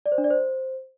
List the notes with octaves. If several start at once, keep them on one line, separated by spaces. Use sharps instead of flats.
D5
C5
D4
D5
C5